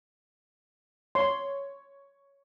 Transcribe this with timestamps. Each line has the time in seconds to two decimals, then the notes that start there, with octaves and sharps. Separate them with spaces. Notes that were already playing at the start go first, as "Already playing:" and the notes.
1.15 C#5 C6